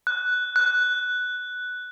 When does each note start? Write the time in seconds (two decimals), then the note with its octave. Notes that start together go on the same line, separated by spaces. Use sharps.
0.07 F#6
0.56 F#6